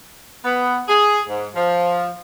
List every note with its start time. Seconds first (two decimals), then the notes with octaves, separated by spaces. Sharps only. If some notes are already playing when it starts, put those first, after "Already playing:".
0.44 B3
0.88 G#4
1.28 G#2
1.55 F3